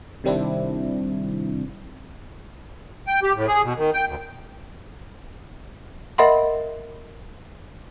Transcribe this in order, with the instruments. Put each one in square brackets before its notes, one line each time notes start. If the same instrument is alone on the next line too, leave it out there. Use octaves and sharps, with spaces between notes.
[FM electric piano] C3 D#3 G3 C4 D4 E4
[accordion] G5
G4
A2
G#4
B2
D#3
G5
D2
[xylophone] A#4 D#5 E5 F#5 B5 C6